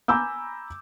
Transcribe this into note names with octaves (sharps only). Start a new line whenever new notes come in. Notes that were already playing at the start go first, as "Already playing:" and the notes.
G#5 A#5 B5 D6 E6 G6